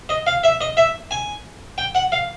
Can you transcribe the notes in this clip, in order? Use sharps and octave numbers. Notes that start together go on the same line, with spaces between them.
D#5
F5
E5
D#5
E5
G#5
G5
F#5
F5